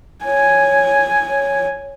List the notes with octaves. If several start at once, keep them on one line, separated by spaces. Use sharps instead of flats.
C#5 G#5
C#5